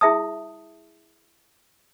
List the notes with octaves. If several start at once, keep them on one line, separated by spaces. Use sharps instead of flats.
E4 G#4 E5 A5 D#6